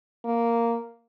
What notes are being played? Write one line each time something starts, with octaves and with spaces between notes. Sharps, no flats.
A#3